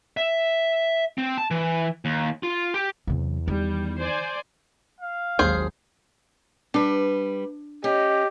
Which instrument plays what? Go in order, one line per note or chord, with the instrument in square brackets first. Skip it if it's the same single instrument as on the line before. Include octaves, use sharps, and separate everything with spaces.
[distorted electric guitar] E5
C4
A5
E3
D#2
F4
G4
[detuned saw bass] E2 [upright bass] C3 F#3
[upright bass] D#3 [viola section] G3
[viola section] C5 D5 G#5
[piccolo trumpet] F5
[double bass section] G#1 D#2 F#3 [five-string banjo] G#4 C5
[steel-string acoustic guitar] G3 B4 [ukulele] D4
[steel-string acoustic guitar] C#4 [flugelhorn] G4 [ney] D#5